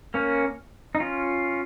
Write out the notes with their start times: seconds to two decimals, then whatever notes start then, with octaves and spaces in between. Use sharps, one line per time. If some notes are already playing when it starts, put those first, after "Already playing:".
0.14 A#3 C#4
0.95 D#4
1.00 C#4 F4